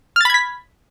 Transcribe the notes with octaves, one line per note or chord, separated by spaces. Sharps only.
B5 F6 G#6 A6 B6